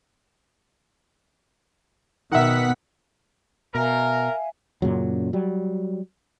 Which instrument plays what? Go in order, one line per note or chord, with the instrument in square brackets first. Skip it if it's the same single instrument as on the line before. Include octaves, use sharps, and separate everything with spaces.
[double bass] B2 B3 [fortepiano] D#3 E5 [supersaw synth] F#5 B6
[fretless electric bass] B2 [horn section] A#4 [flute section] E5 F5 G#5
[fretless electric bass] F#2 A#2 C#3 F#3
F#3 G3